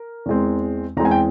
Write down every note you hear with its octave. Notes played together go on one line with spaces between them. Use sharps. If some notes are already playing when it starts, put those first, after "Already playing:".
Already playing: A#4
E2 E3 G#3 C4
E2 E3 G#3 C4 A#5
G#5
G5